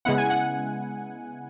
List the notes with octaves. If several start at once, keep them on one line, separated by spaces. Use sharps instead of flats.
C#3 G#3 B3 E4 F#5
G#5
F#5